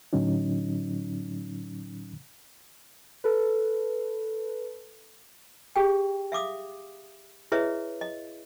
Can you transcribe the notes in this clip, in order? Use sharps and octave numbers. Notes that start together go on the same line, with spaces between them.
A2 D3 F#3 C#4 D#4
A4 B4
G4 G#4 G5
E5 F5 D6 D#6
E4 G#4 B4 C#5 D#5 E5
D#5